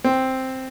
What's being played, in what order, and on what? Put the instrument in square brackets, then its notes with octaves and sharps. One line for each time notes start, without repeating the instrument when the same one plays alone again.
[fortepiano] C4